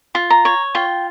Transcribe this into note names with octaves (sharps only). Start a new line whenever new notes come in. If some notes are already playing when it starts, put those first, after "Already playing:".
F4
A#5
C#5
F4 G5